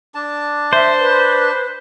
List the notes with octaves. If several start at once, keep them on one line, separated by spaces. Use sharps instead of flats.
D4 A5
C5 E5
B4